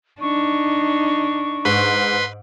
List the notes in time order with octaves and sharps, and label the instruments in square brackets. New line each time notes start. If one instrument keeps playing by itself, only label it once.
[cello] D4 D#4 [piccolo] C#6
[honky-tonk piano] G#2 [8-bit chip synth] B4 B5 C6